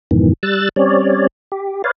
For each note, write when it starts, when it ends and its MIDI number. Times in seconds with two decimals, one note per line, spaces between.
0.11 0.33 41
0.11 0.33 44
0.11 0.33 47
0.11 0.33 51
0.11 0.33 52
0.43 0.69 55
0.43 0.69 88
0.43 0.69 90
0.43 0.69 93
0.76 1.27 55
0.76 1.27 60
0.76 1.27 61
0.76 1.27 73
0.76 1.27 74
1.52 1.82 67
1.84 1.91 71
1.84 1.91 73
1.84 1.91 74
1.84 1.91 77